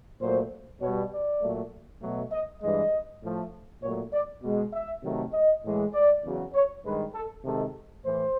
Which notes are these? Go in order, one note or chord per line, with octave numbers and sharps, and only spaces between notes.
A#2 F#3 A3 C5
B2 G3 C#5
D5
A#2 F#3 A3
B2 F#3 A3
D#5
G2 E3 G#3 D#5
A2 F3 A3
A#2 F#3 A3 C#5
D5
B2 G#3
E5
C3 D#3 F#3 A3
D#5
A2 E3 G#3
D5
E2 C#3 F#3
C#5
G2 D#3 G#3 B4
A4
C3 D#3 G#3 A4
A2 E3 C5